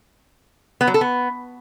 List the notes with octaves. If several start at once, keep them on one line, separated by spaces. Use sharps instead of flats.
B3
F#3
A4
B3